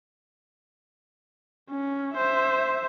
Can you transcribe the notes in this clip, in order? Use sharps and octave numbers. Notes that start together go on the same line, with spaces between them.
C#4
C5 E5